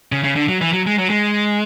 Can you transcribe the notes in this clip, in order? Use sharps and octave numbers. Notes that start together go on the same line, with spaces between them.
C#3
C#3
D3
F#3
E3
F#3
G#3
F#3
G#3